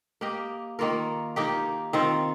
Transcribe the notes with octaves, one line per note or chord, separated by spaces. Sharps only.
A#3 G4 D#5
D#3 A#3 F4 A#4
D#3 A#3 D#4 G4
D#3 C4 F4